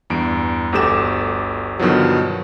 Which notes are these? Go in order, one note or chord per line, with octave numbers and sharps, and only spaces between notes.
E2 G2 D7
G1 D2 G4 A4 D6 E7
G2 B2 D3 D#3 F3 F#3